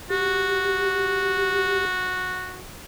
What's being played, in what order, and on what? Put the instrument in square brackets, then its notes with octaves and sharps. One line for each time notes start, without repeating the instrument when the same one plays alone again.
[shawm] F#4 [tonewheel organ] G4